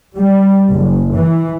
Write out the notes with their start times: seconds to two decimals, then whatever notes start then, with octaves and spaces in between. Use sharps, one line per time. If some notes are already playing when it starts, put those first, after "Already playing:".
0.15 G3
0.72 F#1
1.14 E3